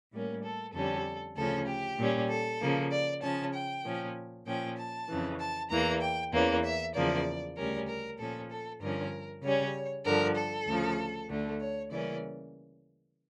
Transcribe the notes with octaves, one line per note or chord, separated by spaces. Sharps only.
A2 G3 A#3 C#4
A4
F2 D3 G3 C#4 A4
D2 C#3 F3 C#4 A4
G4
A#2 G3 C#4
A4
C#3 F3 A#3
D5
C#3 F3 C#4 A5
G5
A#2 F3 C#4
A#2 F3 C#4 G5
A5
F2 C#3 E3
A5
E2 E3 A#3 A#5
G5
E2 E3 A#3 C#4
E5
E2 C#3 F3 A#3 D5
D2 C#3 G3 C#4 A#4
A#4
A#2 F3 C#4 A4
A4
G2 D3 F3 C#4 A#4
C#3 G3 C#4 C#5
G2 D3 F3 A#4
A4
D2 C#3 F3
D2 D3 A3
C#5
C#3 E3 G3 A#3 C#4 D5